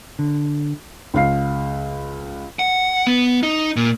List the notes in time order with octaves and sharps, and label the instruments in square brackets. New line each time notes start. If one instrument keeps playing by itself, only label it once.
[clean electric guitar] D3
[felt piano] C#2 F5 C7
[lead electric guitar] F#5
B3
D#4
A#2